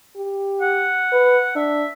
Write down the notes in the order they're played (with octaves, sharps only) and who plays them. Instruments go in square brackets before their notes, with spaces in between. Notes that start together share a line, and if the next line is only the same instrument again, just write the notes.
[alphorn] G4
[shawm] F#5
[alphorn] B4
[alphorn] D4 [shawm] E5